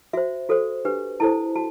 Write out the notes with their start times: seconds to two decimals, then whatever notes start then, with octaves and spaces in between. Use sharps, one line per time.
0.13 F#4 C5 E5
0.49 F#4 A4 C5
0.85 D4 G4 B4
1.20 E4 A4 C5 A5
1.55 F#4 A5